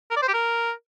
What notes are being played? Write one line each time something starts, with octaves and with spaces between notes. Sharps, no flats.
A#4
D5
C5
G4
A#4